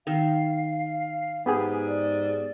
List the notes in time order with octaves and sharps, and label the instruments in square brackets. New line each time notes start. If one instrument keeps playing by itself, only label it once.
[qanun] D#3 [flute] F5
[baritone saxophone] G#2 [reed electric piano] B3 G4 G#4 [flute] G#5
[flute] D5